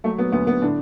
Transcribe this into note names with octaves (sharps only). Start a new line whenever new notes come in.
F#3 A3
F#3 B3
D2 B3
D2 B3
A2 D3 D4